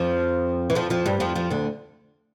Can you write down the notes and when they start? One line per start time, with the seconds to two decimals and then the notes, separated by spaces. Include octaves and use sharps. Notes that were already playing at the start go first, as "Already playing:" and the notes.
Already playing: F2 F3
0.70 E3
0.75 F2 F3
0.90 F2 F3
1.06 G2 G3
1.20 F2 F3
1.35 F2 F3
1.50 D2 D3